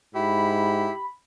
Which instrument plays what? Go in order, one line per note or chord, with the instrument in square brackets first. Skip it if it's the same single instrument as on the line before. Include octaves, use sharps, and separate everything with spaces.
[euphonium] G#2 [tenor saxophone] E4 [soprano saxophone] G4 [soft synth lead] B5